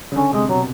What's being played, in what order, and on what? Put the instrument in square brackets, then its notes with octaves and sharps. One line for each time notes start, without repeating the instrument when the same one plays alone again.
[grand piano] C#3
[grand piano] D3 [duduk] C#4
[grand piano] C3 [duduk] G#3
[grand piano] B2 [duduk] F#3